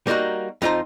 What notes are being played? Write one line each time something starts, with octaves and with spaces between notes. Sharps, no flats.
G3 A#3 D#4 E4 F#4
F2 D#4 F4 C5 A#5